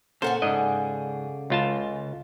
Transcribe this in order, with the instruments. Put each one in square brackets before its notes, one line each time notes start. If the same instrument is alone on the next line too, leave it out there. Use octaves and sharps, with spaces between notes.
[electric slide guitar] A#2 C#4 A#4 [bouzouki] A4 F#5 G#5 [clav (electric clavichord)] C5
[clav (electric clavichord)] G#2 D#5 [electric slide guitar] C#3 G#4 D5
[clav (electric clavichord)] C#2 F4 A5